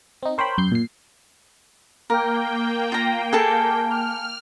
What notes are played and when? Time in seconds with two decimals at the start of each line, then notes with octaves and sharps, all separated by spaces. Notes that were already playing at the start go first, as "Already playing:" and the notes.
0.23 C4 D#4
0.38 A#4 C5 C#5 G5 B5
0.58 F#2 G6 C7
0.72 A#2 C7
2.10 A#3 A#4 G5
2.92 F4 A#5
3.33 G#4 A4 A5
3.91 F6